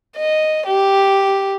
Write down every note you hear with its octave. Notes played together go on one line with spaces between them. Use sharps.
D#5
G4